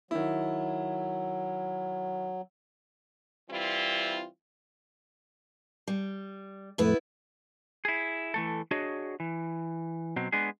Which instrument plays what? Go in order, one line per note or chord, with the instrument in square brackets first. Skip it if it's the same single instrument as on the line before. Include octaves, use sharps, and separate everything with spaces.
[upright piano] D#3 E4 [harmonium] F#3
[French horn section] E3 G3 C4 E4 F4
[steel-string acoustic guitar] G3
[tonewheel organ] F2 A2 A3 [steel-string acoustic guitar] B3 E4 B4
[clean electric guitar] E4 G#4
E3 A3 A4
D4 F#4 G#4 C#5 D#5
E3
B2 F#3 C4
G#3 B3 D4 G#4